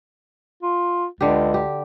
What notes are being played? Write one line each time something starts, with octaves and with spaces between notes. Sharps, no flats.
F4
C#2 D3 G4
G4